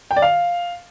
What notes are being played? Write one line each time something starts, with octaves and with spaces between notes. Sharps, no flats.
G5
D5
F5